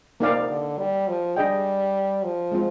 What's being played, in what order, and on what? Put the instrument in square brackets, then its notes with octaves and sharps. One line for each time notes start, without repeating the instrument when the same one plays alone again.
[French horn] C3 [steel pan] A#3 D#4 A#4 D5 F5
[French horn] D3
G3
F3
[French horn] G3 [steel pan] D4 G#4 D#5 G5
[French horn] F3
[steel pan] G#3 C4 F4